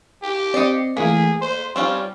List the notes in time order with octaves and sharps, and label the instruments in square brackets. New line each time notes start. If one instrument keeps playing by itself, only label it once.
[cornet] G4
[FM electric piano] C4 C7 C#7 [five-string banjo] D5 D#5
[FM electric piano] E3 A3 B6 [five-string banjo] A#3 [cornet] G#4
[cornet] C5 [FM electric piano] C6
[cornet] G3 [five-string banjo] C4 C#4 F4